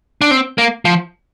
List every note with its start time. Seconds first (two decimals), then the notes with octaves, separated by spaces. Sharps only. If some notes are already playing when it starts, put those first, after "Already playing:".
0.21 D4
0.31 C4
0.58 A#3
0.85 F3